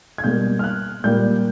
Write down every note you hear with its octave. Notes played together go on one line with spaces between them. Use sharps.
G#6
B2 G3 A#3 G6
F6
F#6
A#2 G3 A#3 G6